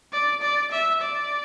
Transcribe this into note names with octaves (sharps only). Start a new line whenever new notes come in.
D5
D5
E5
D5